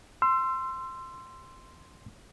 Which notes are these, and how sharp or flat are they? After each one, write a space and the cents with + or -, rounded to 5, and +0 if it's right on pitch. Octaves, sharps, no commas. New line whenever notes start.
C6 +0 E6 +30